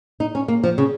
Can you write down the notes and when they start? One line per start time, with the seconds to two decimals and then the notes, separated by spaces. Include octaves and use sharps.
0.20 D#4
0.35 C#4
0.48 A#3
0.63 F3
0.78 C#3